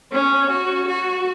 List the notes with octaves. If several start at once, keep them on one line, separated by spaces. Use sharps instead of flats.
C#4
F#4
F#4